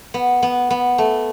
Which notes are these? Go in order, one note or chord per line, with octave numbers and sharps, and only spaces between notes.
B3
B3
B3
A3